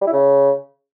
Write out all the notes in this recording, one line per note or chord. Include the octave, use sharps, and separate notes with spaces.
G3
E4
C#3